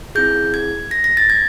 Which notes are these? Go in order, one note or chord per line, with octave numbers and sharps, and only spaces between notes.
C4 E4 G#4 G6
G#6
A#6
A#6
A6
G#6